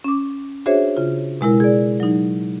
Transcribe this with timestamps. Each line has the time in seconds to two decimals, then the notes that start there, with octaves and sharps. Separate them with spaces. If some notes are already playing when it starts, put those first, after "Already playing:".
0.04 C#4 D6
0.66 D4 F#4 G#4 C5 C#5 E5
0.97 C#3 F4
1.41 B2 G#3 E4 A#4
1.60 G#4 D5
2.00 F#3 D#4